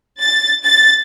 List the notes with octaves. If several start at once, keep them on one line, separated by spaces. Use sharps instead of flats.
A6
A6